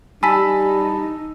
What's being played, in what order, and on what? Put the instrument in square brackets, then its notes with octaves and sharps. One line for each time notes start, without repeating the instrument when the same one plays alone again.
[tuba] G3 [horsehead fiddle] D#4 [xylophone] G#5 B6 [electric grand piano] A5 B5 E6